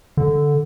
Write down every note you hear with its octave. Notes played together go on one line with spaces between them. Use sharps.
D3